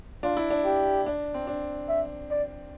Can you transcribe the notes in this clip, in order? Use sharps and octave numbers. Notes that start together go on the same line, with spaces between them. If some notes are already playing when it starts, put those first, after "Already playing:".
D4 F4
E4
D4
G4
D4
C4
D4
E5
D5